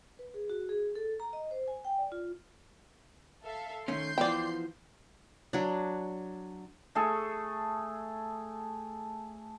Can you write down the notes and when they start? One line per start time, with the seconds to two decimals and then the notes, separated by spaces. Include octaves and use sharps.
0.19 B4
0.34 G#4
0.50 F#4
0.69 G#4
0.95 A4
1.20 A#5
1.33 D#5
1.51 C5
1.68 G#5
1.85 G5
1.98 D5
2.12 F4
3.45 A4 E5 F5
3.88 D#3 A3 C#4 C6 G6 C7
4.18 E3 F3 B3 D5 G5
5.53 F#3 D4
6.95 A3 G#4 A4